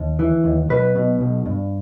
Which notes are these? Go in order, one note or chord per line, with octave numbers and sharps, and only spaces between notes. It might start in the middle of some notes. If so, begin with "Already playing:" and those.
Already playing: D#2
E3
D#2
B1 B4
B2
B1
G2